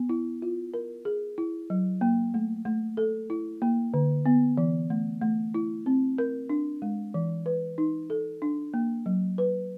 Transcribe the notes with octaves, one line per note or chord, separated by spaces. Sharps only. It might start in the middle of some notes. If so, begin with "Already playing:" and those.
Already playing: B3
E4
F4
A#4
G#4
E4
F#3
A#3
A3
A3
A4
E4
A#3
D3
B3
E3
A3
A3
E4
C4
A#4
D4
G#3
E3
B4
D#4
A4
D4
A#3
F#3
B4